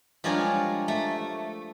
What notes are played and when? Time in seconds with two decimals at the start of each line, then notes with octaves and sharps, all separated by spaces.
0.24 F3 G3 G#3 D4 A#4 C#5
0.88 A3